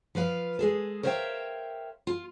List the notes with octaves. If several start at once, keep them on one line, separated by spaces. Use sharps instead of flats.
F3 F4 B4 F5
G#3 G#4 A4
A#4 C5 C#5 E5 F5 G5
F4